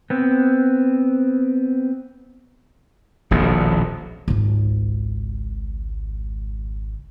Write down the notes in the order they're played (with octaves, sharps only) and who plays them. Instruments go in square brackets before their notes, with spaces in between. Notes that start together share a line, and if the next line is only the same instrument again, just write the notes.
[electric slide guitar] B3 C4
[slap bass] D#1 A#1 B2
[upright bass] G#1 C#2